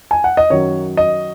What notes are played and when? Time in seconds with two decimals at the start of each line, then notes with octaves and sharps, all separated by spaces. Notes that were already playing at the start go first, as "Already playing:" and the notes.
0.11 G#5
0.24 F#5
0.37 D#5
0.50 F#2 D#3 F#3 C#5
0.97 D#5